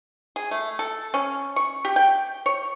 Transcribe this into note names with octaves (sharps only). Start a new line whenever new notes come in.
G#4
A3
A4
C#4
C#6
G4
G5
C#5